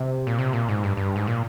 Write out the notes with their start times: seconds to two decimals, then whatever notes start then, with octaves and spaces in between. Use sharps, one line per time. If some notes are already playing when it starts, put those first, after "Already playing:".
Already playing: C3
0.27 A#2
0.39 C3
0.53 A#2
0.69 G#2
0.83 G2
0.97 G2
1.16 G#2
1.27 A#2